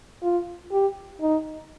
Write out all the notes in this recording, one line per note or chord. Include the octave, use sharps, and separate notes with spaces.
F4
G4
D#4